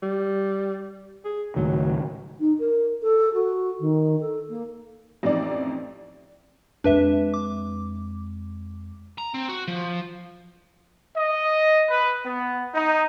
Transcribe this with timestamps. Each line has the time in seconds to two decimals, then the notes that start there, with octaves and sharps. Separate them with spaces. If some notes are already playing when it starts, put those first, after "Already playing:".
0.02 G3
1.25 G#4
1.56 C#2 A2 D#3 F#3
2.40 D#4
2.59 A#4
3.03 A4
3.34 F#4
3.80 D#3
4.20 A4
4.50 A#3
5.23 A1 F2 D#4 D5
6.84 F2 G#3 D4 B4 E5
7.34 D6
9.18 A#5
9.34 C4
9.49 F#4
9.68 F3
11.15 D#5
11.88 B4
12.26 B3
12.75 D#4